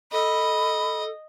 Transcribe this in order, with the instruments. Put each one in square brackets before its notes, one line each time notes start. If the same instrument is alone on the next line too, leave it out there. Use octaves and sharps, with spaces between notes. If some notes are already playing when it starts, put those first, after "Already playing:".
[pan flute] A4 [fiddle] D#5 [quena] B5